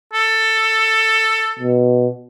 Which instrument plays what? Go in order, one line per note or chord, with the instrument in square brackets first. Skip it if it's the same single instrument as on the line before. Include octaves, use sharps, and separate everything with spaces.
[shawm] A4
[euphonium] B2